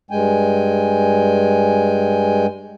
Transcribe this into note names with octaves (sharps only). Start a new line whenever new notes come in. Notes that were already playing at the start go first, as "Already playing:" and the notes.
G2 G#3 G5 G#5